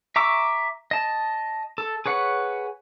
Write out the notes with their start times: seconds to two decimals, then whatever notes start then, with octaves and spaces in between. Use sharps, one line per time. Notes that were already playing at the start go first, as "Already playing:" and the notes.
0.16 E5 A#5 C#6 D6 E6
0.91 D#5 A5
1.78 A4
2.06 G#4 B4 C#5 F#5